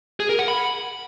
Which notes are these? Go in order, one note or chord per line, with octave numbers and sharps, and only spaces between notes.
G#4
A#4
F#5
B5